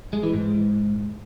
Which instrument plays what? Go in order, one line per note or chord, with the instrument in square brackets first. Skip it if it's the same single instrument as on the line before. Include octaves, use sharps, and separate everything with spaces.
[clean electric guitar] G#3
E3
G#2